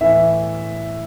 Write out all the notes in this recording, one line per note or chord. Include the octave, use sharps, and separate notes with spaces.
A2 E3 E5